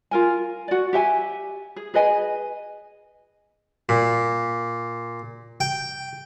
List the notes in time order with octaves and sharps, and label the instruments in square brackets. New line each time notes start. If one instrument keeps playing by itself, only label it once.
[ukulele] F4 A#4 G#5
F#4 D5
G4 E5 G5 G#5
G#4
G#4 B4 D#5 G#5
[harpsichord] A#2
G5